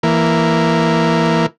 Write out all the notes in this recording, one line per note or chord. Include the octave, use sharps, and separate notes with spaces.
E3 A#3